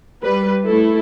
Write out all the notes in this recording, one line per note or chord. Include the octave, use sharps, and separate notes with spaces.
G3 B4
A3 E4 A4